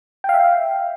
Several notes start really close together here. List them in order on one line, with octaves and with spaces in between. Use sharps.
G5 F5 E5